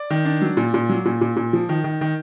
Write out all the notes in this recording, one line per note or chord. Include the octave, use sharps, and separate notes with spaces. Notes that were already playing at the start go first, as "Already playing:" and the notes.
Already playing: D5
D#3
D4
F#3
A#2
A#2
F#3
A#2
A#2
A#2
F3
D#3
D#3
D#3